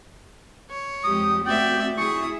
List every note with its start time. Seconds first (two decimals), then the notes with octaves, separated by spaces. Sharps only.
0.70 C#5
1.04 F2 G#3 G4 D#6
1.46 A3 C4 F#4 D5 E5 G5
1.98 E4 G#4 E5 C#6 D#6